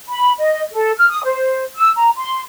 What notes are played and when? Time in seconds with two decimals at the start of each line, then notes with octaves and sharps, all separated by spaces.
0.09 B5
0.39 D#5
0.72 A4
0.98 F6
1.10 D#6
1.25 C5
1.78 E6
1.96 A#5
2.17 C6